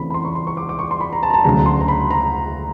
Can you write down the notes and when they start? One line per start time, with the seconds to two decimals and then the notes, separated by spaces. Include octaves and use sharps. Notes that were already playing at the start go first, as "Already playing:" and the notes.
Already playing: C#3 E3 A3 C4 B5
0.10 B5
0.14 C6
0.25 C#6
0.35 C6
0.47 C#6
0.57 D6
0.69 D6
0.79 C#6
0.91 C6
1.01 B5
1.13 A#5
1.23 A5
1.30 A#5
1.34 A5
1.44 D2 C#3 F#3 A#5
1.66 C6
1.81 A#5
1.88 B5
2.11 A#5